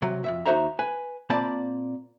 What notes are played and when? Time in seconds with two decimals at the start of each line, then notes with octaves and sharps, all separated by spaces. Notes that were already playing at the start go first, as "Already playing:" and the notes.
0.02 C3 F#3
0.24 F2 A#2 E5
0.45 D#2 D#4 F#4 C5 E5 A#5
0.79 B4 G#5
1.30 A#2 A#3 C4 D5 A5 B5